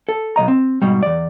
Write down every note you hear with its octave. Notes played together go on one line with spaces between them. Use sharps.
A4
B1 E3 D#5 A#5
C4
G#2 B2 G3
E2 D5